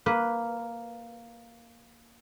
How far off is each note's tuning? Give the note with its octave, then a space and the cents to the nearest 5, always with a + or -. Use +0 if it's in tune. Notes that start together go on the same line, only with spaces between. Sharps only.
A#3 +0 B4 -5